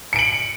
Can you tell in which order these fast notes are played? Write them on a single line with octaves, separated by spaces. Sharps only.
C#7 D7 F#7